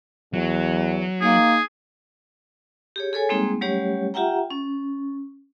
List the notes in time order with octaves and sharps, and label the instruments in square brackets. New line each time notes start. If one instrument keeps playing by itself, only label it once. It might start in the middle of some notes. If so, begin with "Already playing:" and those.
[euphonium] E2 [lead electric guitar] F#3
[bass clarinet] A#3 [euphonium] D#4 [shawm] G#4
[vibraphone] G4 G#4 C#5
G#4 A4 C#5 G#5
G3 G#3 A#3 C4 D#4 G#4
F#3 G3 A3 C#4 G4 C#5
F4 G4 E5 F#5 G5 A#5
C#4